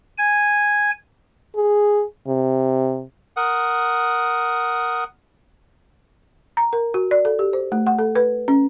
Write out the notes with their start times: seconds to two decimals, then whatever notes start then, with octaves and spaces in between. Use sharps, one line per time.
0.18 G#5
1.56 G#4
2.28 C3
3.37 A#4 F#5 D#6
6.57 A#5
6.73 A#4
6.94 F#4
7.11 D5
7.25 A4
7.39 G4
7.53 C5
7.72 A3
7.87 F#5
7.99 A4
8.16 B4
8.48 C#4